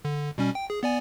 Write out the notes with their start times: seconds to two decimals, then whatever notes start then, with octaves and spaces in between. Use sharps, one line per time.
0.05 D3
0.38 B2 G3 C#4
0.55 G5
0.70 G#4
0.83 B3 D5 G#5